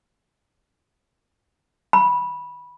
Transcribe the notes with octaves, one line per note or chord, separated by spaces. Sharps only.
B5